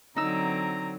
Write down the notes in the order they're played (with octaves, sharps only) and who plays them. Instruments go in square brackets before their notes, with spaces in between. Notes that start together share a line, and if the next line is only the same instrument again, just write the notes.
[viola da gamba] D3 F#3 C4 [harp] D#4 E6 [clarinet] A#5